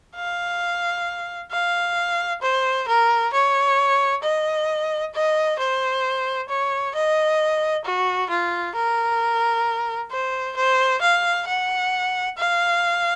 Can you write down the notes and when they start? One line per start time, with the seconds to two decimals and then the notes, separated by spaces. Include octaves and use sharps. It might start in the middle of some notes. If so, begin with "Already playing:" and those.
0.16 F5
1.52 F5
2.42 C5
2.88 A#4
3.33 C#5
4.23 D#5
5.14 D#5
5.59 C5
6.49 C#5
6.95 D#5
7.85 F#4
8.30 F4
8.76 A#4
10.11 C5
10.57 C5
11.02 F5
11.47 F#5
12.38 F5